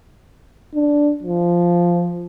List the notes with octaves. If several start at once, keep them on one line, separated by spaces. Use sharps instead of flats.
D4
F3